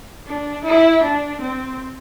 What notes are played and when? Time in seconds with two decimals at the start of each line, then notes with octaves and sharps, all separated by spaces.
0.25 D4
0.63 E4
1.02 D4
1.41 C4